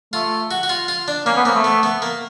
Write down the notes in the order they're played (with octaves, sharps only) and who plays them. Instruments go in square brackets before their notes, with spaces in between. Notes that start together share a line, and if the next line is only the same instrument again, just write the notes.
[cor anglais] A3 [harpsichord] F4
[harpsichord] F#4
F#4
F4
F4
D4
[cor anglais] A#3 [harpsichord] C#4
[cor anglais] B3
[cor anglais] A#3 [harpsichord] C4
[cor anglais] A3
[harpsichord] B3
B3
A#3